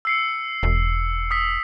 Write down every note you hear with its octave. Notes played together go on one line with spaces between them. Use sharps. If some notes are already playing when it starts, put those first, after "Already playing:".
E6 C7 C#7
E1
D#6 E6 B6